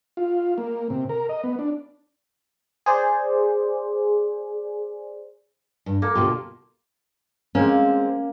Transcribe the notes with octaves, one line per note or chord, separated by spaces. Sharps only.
F4
A#3
C3
A#4
D#5
B3
D4
G#4 C5 D5
G2
A#3 A4
D2 B2 F4 G4
G#3 A#3 C4 C#4